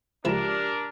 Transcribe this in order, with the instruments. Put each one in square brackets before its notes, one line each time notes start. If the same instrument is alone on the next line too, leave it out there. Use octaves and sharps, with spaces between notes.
[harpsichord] C#2 F3 E4 [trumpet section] D4 A#4 [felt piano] G4 E7